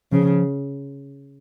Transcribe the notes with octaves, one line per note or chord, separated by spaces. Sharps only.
C#3 F3